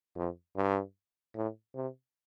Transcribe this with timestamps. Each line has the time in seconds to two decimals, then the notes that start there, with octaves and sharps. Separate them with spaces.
0.16 F2
0.56 G2
1.35 A2
1.75 C3